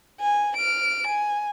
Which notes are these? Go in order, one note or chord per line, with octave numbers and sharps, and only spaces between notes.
G#5
F6 D7
G#5